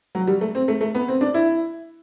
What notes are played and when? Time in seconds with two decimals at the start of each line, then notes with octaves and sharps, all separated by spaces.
0.15 F#3
0.27 G3
0.41 A3
0.55 C4
0.68 A3
0.81 A3
0.95 B3
1.08 C4
1.21 D4
1.34 E4